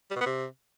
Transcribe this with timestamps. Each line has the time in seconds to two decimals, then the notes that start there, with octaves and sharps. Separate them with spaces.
0.11 G3
0.16 B2
0.21 B3
0.26 C3